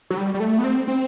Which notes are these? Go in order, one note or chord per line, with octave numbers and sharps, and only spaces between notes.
F#3
G3
G3
A3
B3
C4
C4